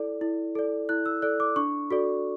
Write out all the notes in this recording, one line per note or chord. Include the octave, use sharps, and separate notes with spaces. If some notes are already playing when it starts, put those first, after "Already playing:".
Already playing: E4 A4 D5
E4
A4 D5
E4 F#6
E6
A4 D5 F#6
D6
D4 C#6
F#4 A4 D5